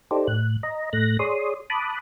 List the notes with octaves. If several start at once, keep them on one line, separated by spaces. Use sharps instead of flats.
D#4 G4 A4 C5 D5
A2 F#6
D#5 A#5
A2 A3 F#6 A#6
G#4 C#5 D5 C6 D#6
A5 B5 D6 D#6 F#6